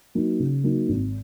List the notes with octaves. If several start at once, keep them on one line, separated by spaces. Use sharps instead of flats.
F#3 A#3 D#4
C#3
F#3 A#3 D#4
G#1